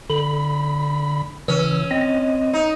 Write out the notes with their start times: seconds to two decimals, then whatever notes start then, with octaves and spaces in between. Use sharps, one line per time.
0.10 D3 B5
1.48 C#3 E3 C#4 E6
1.91 C4 D#5
2.53 D#4